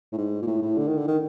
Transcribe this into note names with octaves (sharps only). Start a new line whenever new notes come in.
A2
G#2
A#2
A2
A2
D3
D#3
D3
D#3